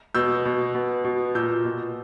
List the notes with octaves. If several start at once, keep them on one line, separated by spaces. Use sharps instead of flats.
B2 E6 G6
B2
B2
B2
A#2 E6 G6
B2